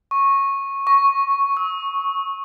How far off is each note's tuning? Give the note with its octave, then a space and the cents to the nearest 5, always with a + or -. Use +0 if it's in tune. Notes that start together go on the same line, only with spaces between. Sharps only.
C#6 -15
C#6 +0
E6 -40